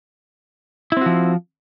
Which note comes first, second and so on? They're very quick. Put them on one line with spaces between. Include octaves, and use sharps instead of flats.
E4 C4 F#4 F3